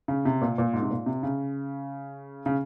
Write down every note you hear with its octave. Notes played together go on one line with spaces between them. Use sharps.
C#3
C3
A#2
A#2
G#2
C3
A#2
C3
C#3
C#3